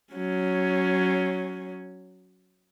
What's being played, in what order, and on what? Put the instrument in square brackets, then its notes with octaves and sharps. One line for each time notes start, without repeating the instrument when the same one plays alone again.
[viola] F#3 C#4